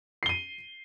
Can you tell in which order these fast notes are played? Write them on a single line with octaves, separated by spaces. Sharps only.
C7 G7 D#7